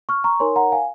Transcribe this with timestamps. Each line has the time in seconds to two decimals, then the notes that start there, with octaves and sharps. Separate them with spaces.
0.09 C#6 F6
0.24 A#5 C#6
0.40 D#4 A#4 C#5 G#5 C6
0.56 F#5 A#5
0.72 F5 G#5